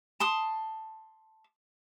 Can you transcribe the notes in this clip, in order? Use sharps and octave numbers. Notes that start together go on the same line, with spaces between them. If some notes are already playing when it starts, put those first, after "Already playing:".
A5 C6 D#6